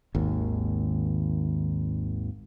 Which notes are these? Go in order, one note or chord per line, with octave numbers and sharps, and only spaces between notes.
G#1 D#2